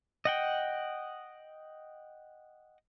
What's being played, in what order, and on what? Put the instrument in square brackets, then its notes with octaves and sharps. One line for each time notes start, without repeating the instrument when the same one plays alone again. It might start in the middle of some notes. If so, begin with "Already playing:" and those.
[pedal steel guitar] D#5 F#5 G5